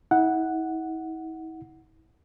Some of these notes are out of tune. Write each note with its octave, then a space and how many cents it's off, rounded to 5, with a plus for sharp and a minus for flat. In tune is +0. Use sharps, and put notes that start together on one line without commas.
E4 -40 F#5 +0